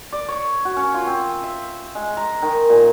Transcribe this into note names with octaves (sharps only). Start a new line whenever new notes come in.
D5
C#5
F#4
C#4
F4
C4
E5
G#3
A#5
D#3
A#2